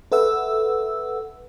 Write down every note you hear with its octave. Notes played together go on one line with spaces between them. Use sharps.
A4 B4 E5 F#5 E6